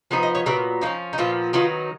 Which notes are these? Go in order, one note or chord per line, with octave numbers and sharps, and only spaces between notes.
F3 B3 D#4 B4
D#5
C#5
A#2 F#3 B3 A#4
F3 A#3 C#4 D#4
D#4
A#2 F3 B3 F4
D#3 F#3 B3 D#4 F4